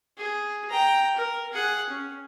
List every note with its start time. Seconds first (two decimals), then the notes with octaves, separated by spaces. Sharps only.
0.18 G#4
0.70 G5 A#5
1.16 A#4
1.52 G#4 F#5
1.90 C#4